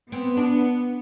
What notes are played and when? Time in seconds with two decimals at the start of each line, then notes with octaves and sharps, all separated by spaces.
0.11 B3 C4
0.37 D4